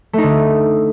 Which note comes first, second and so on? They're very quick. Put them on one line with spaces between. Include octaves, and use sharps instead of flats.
A3 D#4 D3